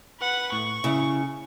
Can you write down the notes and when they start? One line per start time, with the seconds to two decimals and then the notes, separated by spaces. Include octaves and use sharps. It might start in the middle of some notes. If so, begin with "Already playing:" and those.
0.20 B4 F#5
0.52 A2 C#6
0.84 C#3 E4